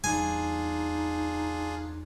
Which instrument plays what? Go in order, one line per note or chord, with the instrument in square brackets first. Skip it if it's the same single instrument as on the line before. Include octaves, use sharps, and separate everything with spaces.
[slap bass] E2 G3 [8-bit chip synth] D4 F4 G#4 [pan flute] D#4 [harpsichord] G#5